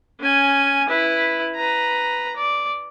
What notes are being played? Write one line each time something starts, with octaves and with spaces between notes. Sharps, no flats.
C#4 G#5
E4 B4
B4 A#5
D5